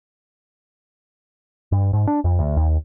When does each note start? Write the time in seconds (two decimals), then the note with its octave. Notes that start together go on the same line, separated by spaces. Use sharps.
1.72 G2
1.93 G#2
2.07 D4
2.24 F2
2.39 D2
2.57 D#2